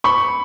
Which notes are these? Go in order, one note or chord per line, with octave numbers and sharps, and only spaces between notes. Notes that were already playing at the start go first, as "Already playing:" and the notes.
B5 C#6